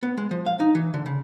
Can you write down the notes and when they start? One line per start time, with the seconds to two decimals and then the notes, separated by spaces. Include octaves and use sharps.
0.03 B3
0.17 G#3
0.31 F3
0.46 F5
0.60 D#4
0.75 E3
0.94 D3
1.06 C#3